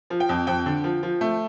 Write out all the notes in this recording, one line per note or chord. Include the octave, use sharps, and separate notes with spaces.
F3
G5
F2
F2 G5
D3
F3
F3
A3